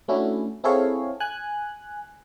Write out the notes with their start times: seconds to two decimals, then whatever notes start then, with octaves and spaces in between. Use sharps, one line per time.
0.08 A3 C#4 D4 E4 F#4
0.64 C4 E4 G#4 A4 C#5 F5
1.20 G#5 F#6